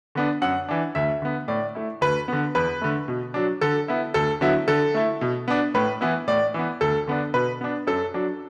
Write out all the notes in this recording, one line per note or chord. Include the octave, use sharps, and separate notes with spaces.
D3 B3 D4
F#2 F#5
E3 D4
D2 E5
D3 B3
A2 D5
A3 E4
D2 B4
D3 B3
E2 B4
D3 A3
B2
F#3 D4
D3 A4
B3 E4
D2 A4
D3 F#3 B3 E4
D3 A4
A3 E4
B2
B3 D4
A2 B4
E3 B3 E4
A2 D5
E3 B3
D2 A4
D3 B3 D4
B2 B4
B3 D4
F#2 A4
F#3 D4